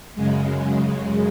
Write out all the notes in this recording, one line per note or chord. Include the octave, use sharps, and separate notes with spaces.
F#2 C#3 G#3